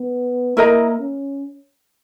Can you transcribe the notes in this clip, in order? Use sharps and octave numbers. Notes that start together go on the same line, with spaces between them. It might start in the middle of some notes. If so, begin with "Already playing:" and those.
Already playing: B3
A#3 E4 A#4 D#5 A#5
C#4